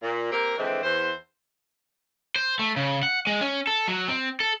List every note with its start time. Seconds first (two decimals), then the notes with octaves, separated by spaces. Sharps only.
0.02 A#2
0.32 A#3 C4 G4 A#4
0.58 D3 E3 F3 G#3 C4
0.83 E2 C5
2.36 C5
2.59 A3
2.76 C#3
3.03 F#5
3.27 G#3
3.41 C#4
3.67 A4
3.88 F#3
4.08 C4
4.40 A4